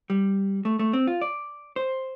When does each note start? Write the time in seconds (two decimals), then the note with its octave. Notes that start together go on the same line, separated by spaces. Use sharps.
0.10 G3
0.65 A3
0.79 A3
0.93 C4
1.07 F4
1.21 D5
1.76 C5